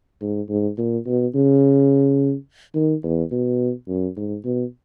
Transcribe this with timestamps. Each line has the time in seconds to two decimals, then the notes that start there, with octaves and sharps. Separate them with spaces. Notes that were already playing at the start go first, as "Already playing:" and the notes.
0.21 G#2
0.49 G#2
0.78 A#2
1.06 B2
1.35 C#3
2.75 D#3
3.03 E2
3.31 B2
3.88 F#2
4.17 G#2
4.45 B2